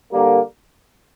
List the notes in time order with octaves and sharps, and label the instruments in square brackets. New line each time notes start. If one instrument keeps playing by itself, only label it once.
[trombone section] D3 G3 A#3